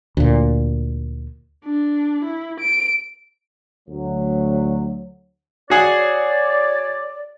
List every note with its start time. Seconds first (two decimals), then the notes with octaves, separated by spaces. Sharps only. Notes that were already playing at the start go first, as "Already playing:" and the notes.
0.17 D2 A#2
1.65 D4
2.24 E4
2.60 D7
3.89 D2 F#3
5.70 F#4 G#4 C#5 D5 F#5